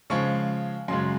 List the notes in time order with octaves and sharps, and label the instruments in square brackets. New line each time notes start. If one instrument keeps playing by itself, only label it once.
[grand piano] C#3 F3 G#3 C#6
F#2 C#3 G#3 C6